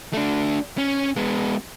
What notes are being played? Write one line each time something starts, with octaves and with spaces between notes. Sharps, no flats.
A3 D4
C#4
G#3 B3